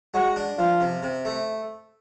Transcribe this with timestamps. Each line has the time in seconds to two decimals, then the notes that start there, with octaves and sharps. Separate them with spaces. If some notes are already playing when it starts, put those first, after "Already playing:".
0.14 G#3 F#4
0.36 D4
0.58 F3 F4
0.80 C3
1.03 C3
1.25 A3